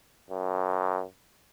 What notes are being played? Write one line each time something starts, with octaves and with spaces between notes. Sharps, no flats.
F#2